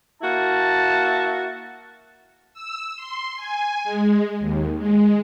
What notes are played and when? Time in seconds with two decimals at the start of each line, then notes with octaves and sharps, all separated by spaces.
0.22 A#3 E4 F#4 A5
2.54 E6
2.96 C6
3.36 G#5
3.84 G#3
4.40 D#2
4.78 G#3